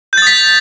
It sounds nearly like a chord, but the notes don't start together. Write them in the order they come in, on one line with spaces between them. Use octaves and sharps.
G6 A6 D#6 B6